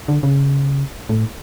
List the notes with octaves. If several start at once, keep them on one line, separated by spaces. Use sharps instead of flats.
D3
C#3
A2